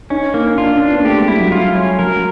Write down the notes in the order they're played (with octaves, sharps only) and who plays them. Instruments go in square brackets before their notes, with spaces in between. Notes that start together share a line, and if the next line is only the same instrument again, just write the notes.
[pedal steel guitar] C#4 [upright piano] D#4
[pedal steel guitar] A#3 [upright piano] D#4
[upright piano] D#4
[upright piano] D4 [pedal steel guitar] F4
[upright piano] C#4
[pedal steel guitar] D4
[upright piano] B3
A#3
[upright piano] A3 [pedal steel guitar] G4
[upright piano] G#3
[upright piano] G3 [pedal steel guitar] E4
[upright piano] F#3
[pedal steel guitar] F4
C#4
[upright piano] F#3 [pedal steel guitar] A#4